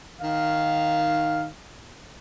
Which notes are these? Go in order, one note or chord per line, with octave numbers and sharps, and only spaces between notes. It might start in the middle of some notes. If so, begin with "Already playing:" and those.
D#3 F5